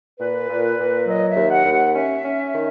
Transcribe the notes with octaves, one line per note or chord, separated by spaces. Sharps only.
A#2 B4
A#2
A#2
F#3 D#5
E5
D#2
F#5
D#2
F#5
C#4 E5
C#4
D#3